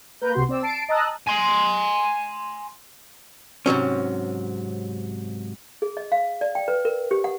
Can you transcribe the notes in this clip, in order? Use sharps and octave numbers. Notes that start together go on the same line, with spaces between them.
A#3 A#4 B4 G6
C2 C3 F#4 C6
C4 D5 E6
A5 C7 D7
D#5 A5 A#5 D#6 E6 F#6
G#5 C6
G#2 C3 F#3 C#4
G#4
D#5
F5
D5
G5
B4
A#4
G4
F#5